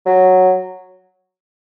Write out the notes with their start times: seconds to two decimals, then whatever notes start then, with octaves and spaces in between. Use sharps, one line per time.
0.06 F#3